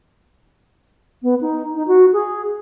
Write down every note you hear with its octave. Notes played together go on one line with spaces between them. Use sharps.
B3
D#4
D#4
F#4
G#4